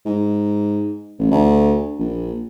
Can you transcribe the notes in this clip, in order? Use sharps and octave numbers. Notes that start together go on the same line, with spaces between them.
G#2
A1
D2
A#1